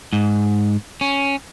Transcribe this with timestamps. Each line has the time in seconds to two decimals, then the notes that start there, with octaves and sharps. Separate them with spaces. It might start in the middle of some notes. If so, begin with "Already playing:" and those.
0.13 G#2
1.01 C#4